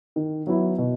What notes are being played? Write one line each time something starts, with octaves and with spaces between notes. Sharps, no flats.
D#3
F#3 B3 E4
B2